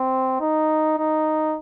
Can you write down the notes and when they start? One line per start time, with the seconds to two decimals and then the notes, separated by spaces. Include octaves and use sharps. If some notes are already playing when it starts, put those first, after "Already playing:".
Already playing: C4
0.40 D#4
0.98 D#4